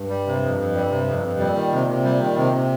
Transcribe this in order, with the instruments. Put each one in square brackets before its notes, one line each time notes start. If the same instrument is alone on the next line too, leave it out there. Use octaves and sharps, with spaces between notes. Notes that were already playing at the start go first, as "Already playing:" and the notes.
Already playing: [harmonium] G2
[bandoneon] G3
C3
F2
F2
G3
C3
F2
F2
[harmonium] C3
[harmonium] A#2 [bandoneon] G3
[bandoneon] D#3
C3
C3
G3
D#3
C3
C3